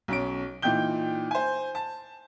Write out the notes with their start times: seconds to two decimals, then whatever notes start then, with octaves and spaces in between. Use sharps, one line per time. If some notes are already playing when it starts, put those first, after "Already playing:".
0.08 B1 C#4 D7
0.62 A#2 E3 D#4 G5 G6 G7
1.31 C5 G#5
1.75 A5